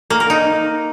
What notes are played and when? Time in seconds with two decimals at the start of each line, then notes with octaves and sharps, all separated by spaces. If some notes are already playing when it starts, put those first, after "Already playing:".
0.10 A#3
0.20 A#4
0.30 D#4